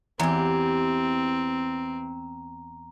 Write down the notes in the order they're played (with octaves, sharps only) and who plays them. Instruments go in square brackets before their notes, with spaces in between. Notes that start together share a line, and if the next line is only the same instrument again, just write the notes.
[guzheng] E2 [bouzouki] E3 G4 [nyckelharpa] C4 [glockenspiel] A#5